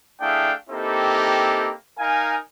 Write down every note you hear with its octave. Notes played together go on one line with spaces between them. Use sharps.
A3 D4 E4 G#4 F5 G5
A#3 C4 D#4 E4 G4 A4
D#4 A#4 F5 G#5